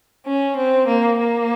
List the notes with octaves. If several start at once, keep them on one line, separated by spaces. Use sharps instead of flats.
C#4
C4
A#3
A#3